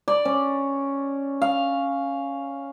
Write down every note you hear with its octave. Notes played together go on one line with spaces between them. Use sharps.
D5
C#4
F5